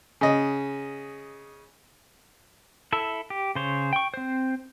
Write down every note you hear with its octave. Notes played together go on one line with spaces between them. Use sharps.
C#3 D#5
E4 A4 E5
G4
C#3 C5 C#5
G5 C#6
C4 C5